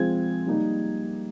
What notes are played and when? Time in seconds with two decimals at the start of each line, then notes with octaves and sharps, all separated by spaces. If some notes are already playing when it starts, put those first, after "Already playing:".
Already playing: F3 G#3 C4 F4 G#6
0.47 G3 A#3 D#4